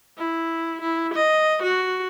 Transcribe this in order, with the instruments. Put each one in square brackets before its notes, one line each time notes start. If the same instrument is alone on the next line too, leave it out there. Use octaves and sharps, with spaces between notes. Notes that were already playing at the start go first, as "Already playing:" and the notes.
[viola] E4
E4
D#5
F#4